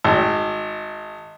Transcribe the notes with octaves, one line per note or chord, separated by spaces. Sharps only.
G#1